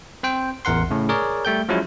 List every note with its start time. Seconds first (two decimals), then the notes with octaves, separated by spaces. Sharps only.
0.23 C4 C5 G5
0.65 A1 E2 A#4 F#5 C6
0.90 A2 C#3
1.09 G#4 A#4 C#5 D5
1.45 G3 A3 G5 G6
1.69 F3 F#3 G#3 C#4 E4